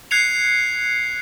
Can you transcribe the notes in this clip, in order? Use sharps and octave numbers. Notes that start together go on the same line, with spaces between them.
F#6 G#6 C7 C#7 F7